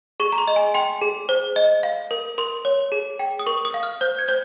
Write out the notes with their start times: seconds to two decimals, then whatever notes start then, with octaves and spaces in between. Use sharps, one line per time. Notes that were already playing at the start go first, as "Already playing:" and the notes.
0.20 G#4 C#6
0.32 A#5
0.38 C6
0.48 D#5
0.56 G#5
0.74 G5 C6
1.02 G#4
1.29 C5
1.56 D#5
1.83 F5
2.11 A#4
2.38 A#4 C6
2.65 C#5
2.92 G#4
3.19 G5
3.39 D#6
3.46 A#4 C#6
3.65 D#6
3.74 F5
3.83 F6
4.01 C5 G6
4.19 G#6
4.28 C5 G6